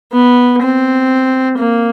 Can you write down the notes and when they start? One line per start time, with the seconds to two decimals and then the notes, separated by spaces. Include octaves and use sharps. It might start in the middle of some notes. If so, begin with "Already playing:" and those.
0.12 B3
0.61 C4
1.58 A#3